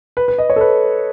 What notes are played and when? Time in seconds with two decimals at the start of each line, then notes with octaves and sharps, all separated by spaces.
0.17 B4
0.28 B4
0.38 D#5
0.50 C#5
0.56 A4
0.61 B4